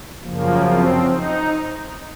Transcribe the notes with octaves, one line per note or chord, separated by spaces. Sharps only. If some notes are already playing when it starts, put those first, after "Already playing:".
F#2 C#3 F3 A#3
C4
D#4